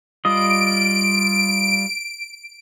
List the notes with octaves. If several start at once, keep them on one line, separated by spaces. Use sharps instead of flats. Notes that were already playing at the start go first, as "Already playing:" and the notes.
G3 F4 D#5 D7